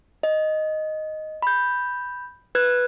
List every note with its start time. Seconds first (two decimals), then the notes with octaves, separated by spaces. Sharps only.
0.23 D#5
1.42 B5 G6
2.55 B4 F#6 G#6